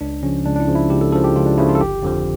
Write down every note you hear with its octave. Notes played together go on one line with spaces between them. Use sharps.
C#2 D4
C#3 F3 C#4
C#2 D4
D4
E4
C#3 F3
E4
C#2 G4
A4
C#3 F3 A4
G4
C#2 F4
D4
C#3 F3 E4
F4
A4
G1 G4
F2 D3 F3